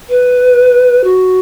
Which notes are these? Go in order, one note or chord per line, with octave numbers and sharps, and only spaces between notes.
B4
F#4